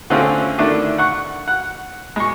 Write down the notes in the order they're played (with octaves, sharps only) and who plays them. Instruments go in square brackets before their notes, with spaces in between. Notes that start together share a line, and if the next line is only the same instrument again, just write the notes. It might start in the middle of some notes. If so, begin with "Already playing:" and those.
[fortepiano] D3 A3 C4 C#4 F4 G#4
D3 D#3 A3 D4 E4
F#5 C#6
F#5
G#3 C#6